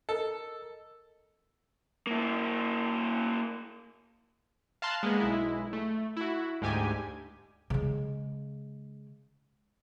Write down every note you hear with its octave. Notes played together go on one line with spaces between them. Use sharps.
A4 A#4 D#5
A#3 E4
F5 A5 A#5 C6 F6 F#6
G#3 A#3 B3
B1 G#3 E4
A3
E4 F#4
D2 G#2 G4 G#5
C#3 G#3